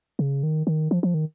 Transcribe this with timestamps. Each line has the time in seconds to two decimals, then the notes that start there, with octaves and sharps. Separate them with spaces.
0.19 C#3
0.43 D#3
0.67 D#3
0.91 F3
1.03 F3
1.14 D#3